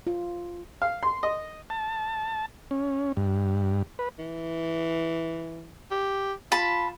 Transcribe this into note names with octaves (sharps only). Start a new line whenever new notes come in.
F4
F5
C6
D#5
A5
C#4
G2
B4
E3
G4
F4 A5 B5